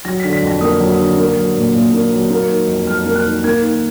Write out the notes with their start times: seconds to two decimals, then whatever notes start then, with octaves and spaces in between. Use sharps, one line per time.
0.05 F#3 A#6
0.20 B6
0.24 D3
0.33 B6
0.42 F2
0.47 A#6
0.61 A#3 D#6
0.80 F#3
0.99 D3
1.18 A#3
1.36 F#3
1.56 A#2
1.75 A#2
1.94 A#3
2.12 F#3
2.31 A#3
2.50 D#3
2.68 F2
2.87 F2 F6
3.06 A#3
3.15 F#6
3.24 D#3
3.44 A#3 G#6
3.62 D#3